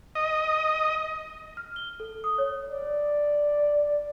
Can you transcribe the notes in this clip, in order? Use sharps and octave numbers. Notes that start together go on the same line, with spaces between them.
D#5
F6
G7
A4
D#6
C#5
D5